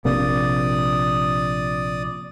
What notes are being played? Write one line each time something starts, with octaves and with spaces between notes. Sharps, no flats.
A#1 C3 A#3 D5 D#6